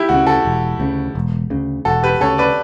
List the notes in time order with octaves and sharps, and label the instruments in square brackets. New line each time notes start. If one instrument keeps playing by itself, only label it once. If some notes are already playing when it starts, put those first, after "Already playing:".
Already playing: [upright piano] E4 G4
[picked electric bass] D2 C#3 [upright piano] F#4
[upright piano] F#4 A4
[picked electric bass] E1
D2 C#3
E1
D2 C#3
[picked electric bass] E1 [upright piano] F#4 A4
[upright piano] G4 B4
[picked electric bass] D2 C#3 [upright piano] A4 C#5
[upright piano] B4 D5